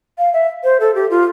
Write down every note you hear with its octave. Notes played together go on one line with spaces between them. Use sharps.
F5
E5
C5
A4
G4
F4